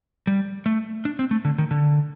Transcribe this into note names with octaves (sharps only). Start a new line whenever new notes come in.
G3
A3
D4
C4
A3
D3
D#3
D3